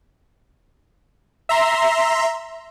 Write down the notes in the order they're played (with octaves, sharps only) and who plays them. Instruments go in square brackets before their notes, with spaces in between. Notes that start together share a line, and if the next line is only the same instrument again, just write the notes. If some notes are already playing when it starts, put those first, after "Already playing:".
[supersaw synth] E5 A#5 C6